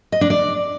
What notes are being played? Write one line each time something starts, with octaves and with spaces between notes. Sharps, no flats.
D#5
D4
D5